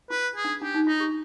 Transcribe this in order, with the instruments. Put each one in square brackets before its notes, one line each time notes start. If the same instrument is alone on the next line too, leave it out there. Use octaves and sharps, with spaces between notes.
[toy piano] F4 [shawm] B4
[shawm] G#4
[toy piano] D4
[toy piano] D4 [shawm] G4
[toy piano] D#4
[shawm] D#4 [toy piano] F4
[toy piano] G4